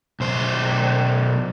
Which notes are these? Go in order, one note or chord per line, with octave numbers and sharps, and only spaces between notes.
B1 C5